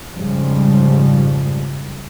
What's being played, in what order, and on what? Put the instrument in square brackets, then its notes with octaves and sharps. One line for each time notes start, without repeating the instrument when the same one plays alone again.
[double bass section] F2 G#2 C#3 F3 G3